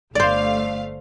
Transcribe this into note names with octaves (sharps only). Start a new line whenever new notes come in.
G1 A3 C5 D5 F5